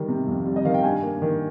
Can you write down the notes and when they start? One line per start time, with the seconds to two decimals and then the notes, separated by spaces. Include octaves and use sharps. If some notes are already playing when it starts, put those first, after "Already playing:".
Already playing: D#3 G3
0.08 C3
0.27 F2
0.46 G3
0.56 D#5
0.65 D#3 F5
0.74 G5
0.84 G2 G#5
1.02 A#3
1.22 D#3